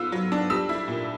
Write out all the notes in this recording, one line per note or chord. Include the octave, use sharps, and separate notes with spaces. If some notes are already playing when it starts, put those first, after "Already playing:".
Already playing: B3 F4 E6
F#3
D4
G3 E6
E4
A#2